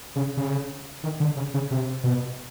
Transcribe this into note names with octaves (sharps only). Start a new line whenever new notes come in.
C#3
C#3
D#3
D3
C#3
C#3
C3
B2